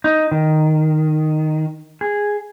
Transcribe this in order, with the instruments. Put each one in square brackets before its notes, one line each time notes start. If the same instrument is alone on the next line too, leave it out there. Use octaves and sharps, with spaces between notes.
[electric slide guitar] D#4
D#3
G#4